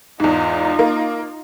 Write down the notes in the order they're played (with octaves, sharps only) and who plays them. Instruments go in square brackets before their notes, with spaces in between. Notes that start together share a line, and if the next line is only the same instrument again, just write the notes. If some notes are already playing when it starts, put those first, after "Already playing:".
[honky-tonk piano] E2 G#2 [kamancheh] D#4 F4
[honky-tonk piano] A#3